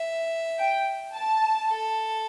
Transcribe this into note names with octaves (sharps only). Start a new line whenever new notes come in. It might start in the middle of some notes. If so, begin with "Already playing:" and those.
Already playing: E5
G5
A5
A4